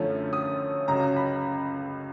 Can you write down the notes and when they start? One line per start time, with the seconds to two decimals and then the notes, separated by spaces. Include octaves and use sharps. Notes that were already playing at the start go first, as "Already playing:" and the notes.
Already playing: F#2 D3 F3 A3 C#4
0.33 D#6
0.88 C#2 C#3 F#3 A#5
1.16 B5